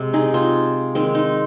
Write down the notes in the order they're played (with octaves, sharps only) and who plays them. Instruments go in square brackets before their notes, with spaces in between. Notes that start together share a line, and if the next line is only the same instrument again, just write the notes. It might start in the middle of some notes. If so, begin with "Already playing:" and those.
Already playing: [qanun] C3 G#3
D#4 G#4
C4 F4
D#3 G#3 C4
D#4